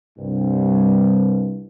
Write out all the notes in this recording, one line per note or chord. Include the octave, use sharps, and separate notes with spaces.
C2 G2